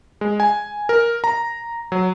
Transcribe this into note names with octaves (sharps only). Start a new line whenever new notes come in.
G#3
G#5
A#4
A#5
F#3